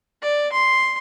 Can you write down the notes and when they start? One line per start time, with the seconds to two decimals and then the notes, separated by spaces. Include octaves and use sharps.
0.22 D5
0.53 C6